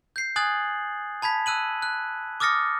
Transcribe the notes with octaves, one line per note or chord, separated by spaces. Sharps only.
G6 C7
G#5 D#6 F#6 G#6 A6 F#7
A5 B5 G#6 B6
E6 F#6 D#7 F#7
F#6
D6 D#6 F6 A6 A#6 C#7